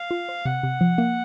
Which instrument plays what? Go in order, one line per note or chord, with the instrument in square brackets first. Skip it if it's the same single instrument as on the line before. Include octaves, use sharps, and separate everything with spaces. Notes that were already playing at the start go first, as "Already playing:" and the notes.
Already playing: [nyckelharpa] F5
[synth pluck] F4
C5
[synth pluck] C3 [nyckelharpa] F#5
[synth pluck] C3
F3
A#3